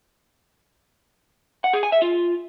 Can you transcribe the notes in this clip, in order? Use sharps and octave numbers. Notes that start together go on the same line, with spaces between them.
F#5
G#4
G#5
E5
F4